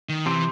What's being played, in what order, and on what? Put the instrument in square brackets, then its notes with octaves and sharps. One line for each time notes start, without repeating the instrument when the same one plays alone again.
[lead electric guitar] D#3
[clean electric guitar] C3 C4 [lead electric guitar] E3